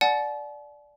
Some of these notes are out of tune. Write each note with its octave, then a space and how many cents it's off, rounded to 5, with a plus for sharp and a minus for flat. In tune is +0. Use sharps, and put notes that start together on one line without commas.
D5 +0 F#5 +0 A5 -45